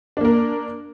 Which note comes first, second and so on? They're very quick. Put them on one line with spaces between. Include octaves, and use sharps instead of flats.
D4 A#3 A#4